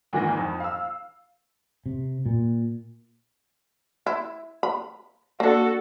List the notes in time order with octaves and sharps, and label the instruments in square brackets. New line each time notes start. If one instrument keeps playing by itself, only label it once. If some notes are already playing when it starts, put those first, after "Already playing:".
[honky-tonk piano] D2 G#2 D#3 E3 A#6
F2
F5 E6
[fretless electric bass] C3
A#2
[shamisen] E4
B5
[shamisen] A#3 D4 [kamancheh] F#4 A4